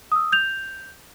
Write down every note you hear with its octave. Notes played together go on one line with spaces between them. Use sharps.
D#6 E6
G6 F7